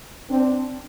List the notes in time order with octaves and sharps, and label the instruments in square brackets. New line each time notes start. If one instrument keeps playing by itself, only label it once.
[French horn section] C4 D4